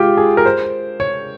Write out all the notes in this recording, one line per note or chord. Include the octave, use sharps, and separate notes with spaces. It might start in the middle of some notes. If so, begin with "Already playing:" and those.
Already playing: G#3 F4 G4
G#4
A#4
C5
C#5